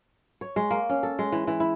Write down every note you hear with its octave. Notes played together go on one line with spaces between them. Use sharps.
C#5
G#3
A#3
C#4
A4
G#3
E3
E3
E4